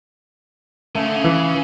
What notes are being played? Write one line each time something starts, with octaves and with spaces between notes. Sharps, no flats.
C#3 A3
D3
C#3
E3